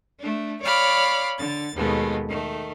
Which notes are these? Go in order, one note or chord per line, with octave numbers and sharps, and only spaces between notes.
A3 D4
C#5 D5 F5 B5 D6 F6
D3 A6
D#2 B2 G#3 A3 B3
D#3 A3